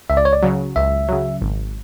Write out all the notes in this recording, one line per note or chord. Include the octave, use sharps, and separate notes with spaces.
C#2 E5
D5
C#5
D5
C#3 F#3
C#2 E5
C#3 F#3
G#1